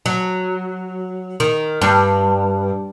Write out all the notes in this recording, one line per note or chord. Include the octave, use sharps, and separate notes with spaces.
F#3
D#3
G2